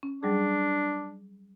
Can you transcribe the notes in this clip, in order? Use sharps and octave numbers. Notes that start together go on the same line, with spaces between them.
C#4
F#3 G3 D4 G#4